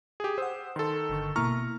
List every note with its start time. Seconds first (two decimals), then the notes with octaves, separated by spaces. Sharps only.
0.20 G4 G#4
0.38 C5 F#5 D#6 E6
0.76 D#3 A4 C6
1.09 G1 D3 C#6
1.36 B2 A#3 E4 A#5 C#6 F6